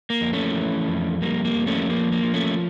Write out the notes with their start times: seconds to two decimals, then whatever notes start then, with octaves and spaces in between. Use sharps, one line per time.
0.10 A#3
0.21 F2
0.33 A3 C#4
0.55 E3
0.88 F2
1.22 G3 A#3
1.45 A#3
1.56 F2
1.67 A3 C#4
1.90 F3 A#3
2.12 A#3
2.23 F3
2.34 A3 C#4